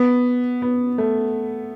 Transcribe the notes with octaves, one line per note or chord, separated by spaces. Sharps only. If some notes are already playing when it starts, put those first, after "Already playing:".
Already playing: B3
B3
A3